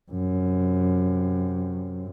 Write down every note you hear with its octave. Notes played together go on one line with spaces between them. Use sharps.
F#2 C3